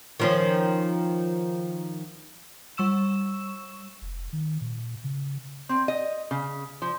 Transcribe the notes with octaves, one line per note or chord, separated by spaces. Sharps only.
D#3 F3 C#4
G3 C#6 E6 E7
F1
D#3
A#2
C#3
C4
D#5
C#3
F3